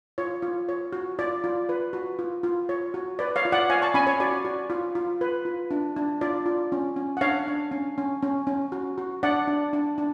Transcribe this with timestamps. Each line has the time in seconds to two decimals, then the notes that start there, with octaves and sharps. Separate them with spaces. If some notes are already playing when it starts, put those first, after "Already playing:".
0.18 F4 C#5
0.42 F4
0.69 C#5
0.93 F#4
1.19 F4 D5
1.44 F4
1.69 B4
1.93 F#4
2.19 F4
2.43 F4
2.69 C#5
2.94 F#4
3.19 B4 D5
3.36 C#5 F5
3.45 F4
3.52 D5 F#5
3.69 C#5 F5 G#5
3.82 A5 C#6
3.94 C#4 G#5 B5
4.07 C#5
4.20 F#4 D5
4.45 F#4
4.70 F4
4.95 F4
5.21 B4
5.45 F4
5.71 D4
5.96 D4
6.21 F4 D5
6.46 F4
6.72 C#4
6.96 C#4
7.17 F#5
7.21 D4 C#5 F5
7.47 D4
7.71 C#4
7.98 C#4
8.23 C#4
8.47 C#4
8.72 F#4
8.98 F#4
9.23 D4 D5 F#5
9.48 D4
9.73 D4
9.98 D4